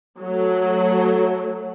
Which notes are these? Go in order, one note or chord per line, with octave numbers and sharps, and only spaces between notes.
F#3 A3